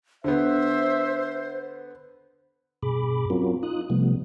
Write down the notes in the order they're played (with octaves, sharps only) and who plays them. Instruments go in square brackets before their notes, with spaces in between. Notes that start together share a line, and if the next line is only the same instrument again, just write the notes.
[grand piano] D3 B3 [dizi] C5 [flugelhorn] E5
[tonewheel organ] G2 B2 G#4 B5 D6
F#3 C4 C#4 F4 F#4 A#4
D#4 F4 D#6 F#6
C3 F3 G3 A3 B3